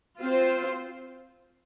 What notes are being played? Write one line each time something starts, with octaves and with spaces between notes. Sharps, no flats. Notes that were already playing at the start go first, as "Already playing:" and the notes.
C4 F4 C5